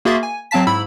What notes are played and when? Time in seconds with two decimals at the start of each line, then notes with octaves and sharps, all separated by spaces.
0.05 A#3 F#4 G#4 E5 C6 A6
0.23 G#5
0.51 F#3 C4 F5 A5 B6
0.67 G#2 E4 B5 E6